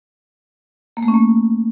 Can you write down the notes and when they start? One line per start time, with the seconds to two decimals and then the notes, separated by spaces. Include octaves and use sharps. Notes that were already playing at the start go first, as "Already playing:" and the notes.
0.97 A#3
1.03 A3
1.08 C#4
1.14 A#3